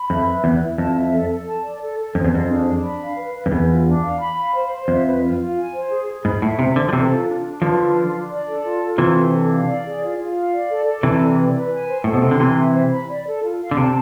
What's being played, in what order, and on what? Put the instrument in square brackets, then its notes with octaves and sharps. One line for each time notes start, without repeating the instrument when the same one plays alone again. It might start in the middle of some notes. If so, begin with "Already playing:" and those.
Already playing: [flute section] B5
[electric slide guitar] F2 [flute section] E5
[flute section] B4
[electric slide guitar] E2 [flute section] E4
[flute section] E4
[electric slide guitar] F2 [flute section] A5
[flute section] E5
A4
A4
A5
D5
A4
A4
[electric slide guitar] F2 [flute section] C5
[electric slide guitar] E2
[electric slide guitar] F2 [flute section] G#4
[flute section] D4
D4
B5
F5
B4
B4
[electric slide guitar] F2
[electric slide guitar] E2 [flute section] B4
[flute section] F4
D4
F5
B5
F5
C5
C5
[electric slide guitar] F2 [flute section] E5
[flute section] B4
F4
F4
G#5
C5
G#4
G#4
[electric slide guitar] G#2 [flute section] B5
[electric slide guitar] A2 [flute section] E5
[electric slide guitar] C3 [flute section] C5
[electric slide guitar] D3 [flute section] C5
[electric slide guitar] F3
[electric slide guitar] C3 E3 [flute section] A4
[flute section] F4
D4
D4
[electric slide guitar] D3 F3 [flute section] B4
[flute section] F4
D4
D4
D5
A4
F4
F4
[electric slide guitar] C3 E3 [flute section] C5
[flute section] A4
D4
F5
D5
G#4
F4
F4
F5
D5
A4
A4
[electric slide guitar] C3 E3 [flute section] G#5
[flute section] D5
B4
B4
G#5
C5
[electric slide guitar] A2 [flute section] A4
[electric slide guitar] B2
[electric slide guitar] C3 [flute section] C6
[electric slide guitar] D3
[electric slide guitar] C3 E3 [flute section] G#5
[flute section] E5
C5
B5
D5
A4
F4
F5
[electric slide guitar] D3
[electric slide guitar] C3 [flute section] A5